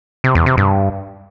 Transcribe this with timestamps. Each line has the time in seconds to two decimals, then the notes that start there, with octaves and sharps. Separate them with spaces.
0.24 C3
0.35 E2
0.46 C3
0.57 G2